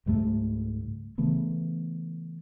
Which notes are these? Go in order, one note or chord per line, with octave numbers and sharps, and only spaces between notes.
C#2 G#2 G3 A3
C#3 E3 A3 B3